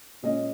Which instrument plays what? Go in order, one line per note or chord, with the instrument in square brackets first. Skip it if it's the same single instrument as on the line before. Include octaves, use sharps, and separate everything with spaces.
[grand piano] A#2 G#3 C#4 D#5